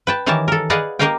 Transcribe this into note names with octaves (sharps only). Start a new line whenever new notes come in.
B4 G5 A5
D#3 E3 G4 A#4 C#5 A5
A4 A#4
G#4 B4 D5 D#5 F5 F#5
A#3 G4 A#4 D#5 F5 G5